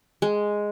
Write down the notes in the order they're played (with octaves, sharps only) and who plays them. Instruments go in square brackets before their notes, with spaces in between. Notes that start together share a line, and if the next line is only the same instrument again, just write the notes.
[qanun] G#3